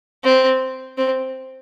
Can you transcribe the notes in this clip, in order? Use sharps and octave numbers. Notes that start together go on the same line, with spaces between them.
C4
C4